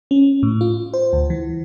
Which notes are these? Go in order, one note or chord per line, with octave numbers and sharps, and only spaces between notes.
C#4
A2
F4
C5
D2
E3